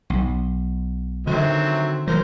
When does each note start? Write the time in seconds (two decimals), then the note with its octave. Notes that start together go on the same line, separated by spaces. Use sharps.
0.10 B1
1.27 D3 D#3 F#3 C4 E5
2.07 E3 F#3 A#4 C5